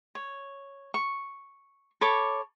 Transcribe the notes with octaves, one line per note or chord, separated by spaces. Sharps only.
C#5
C#6
A4 C#5 B5 D6